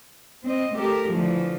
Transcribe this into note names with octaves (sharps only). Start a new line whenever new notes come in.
C4 D#5
A3 G4 A4 A#4
D3 E3 F3 A3